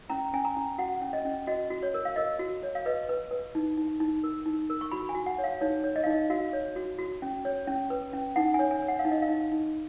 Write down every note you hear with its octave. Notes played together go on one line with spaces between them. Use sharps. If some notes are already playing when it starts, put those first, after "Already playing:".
C#4 A#5
C#4 G#5
A#5
C#4
F#4 F#5
C#4
D#5
C#4
F#4 D#5
F#4
C#5
A#4
F5
A#4 D#5
F#4
C#5
F5
B4 D#5
B4
B4
D#4
D#4
D#4
A#4
D#4
A#4
C#6
F#4 B5
G#5
F#4
F#5
C#5
F5
D#4 C#5
C#5
D#5
F5
D#4 D#5
F#4 F5
C#5
F#4
F#4
C#4
C#5
C#4
B4
C#4
D#4 F#5
C#5 G#5
G#5
C#5
F#5
F5
D#4
D#5
F5
D#4
D#4